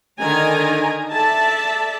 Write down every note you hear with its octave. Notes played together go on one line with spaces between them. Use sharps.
D3 D#3 D#4 A#4 G#5 A#5
A4 D5 E5 A5